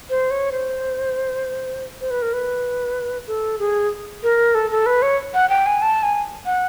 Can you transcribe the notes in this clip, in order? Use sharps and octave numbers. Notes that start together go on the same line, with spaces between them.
C5
C#5
C5
C5
B4
A#4
B4
A4
G#4
A#4
A4
A4
B4
C#5
F#5
G5
G#5
A5
G#5
F#5